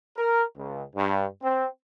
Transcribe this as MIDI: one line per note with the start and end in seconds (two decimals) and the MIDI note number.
0.16 0.43 70
0.57 0.82 37
0.95 1.25 43
1.42 1.66 60